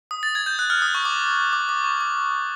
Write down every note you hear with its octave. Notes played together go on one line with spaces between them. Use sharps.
D#6
A6
G#6
G6
F#6
F6
D#6
C#6
D6
D6
D6
C#6
D6